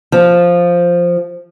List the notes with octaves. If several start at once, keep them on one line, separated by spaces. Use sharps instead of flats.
F3